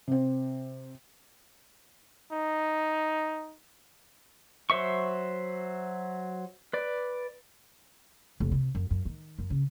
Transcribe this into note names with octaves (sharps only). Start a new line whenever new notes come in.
C3 C4
D#4
F#3 C5 E5 C#6
B4 D5
F1
C3
F#2
F#2
D#3
F#2
C#3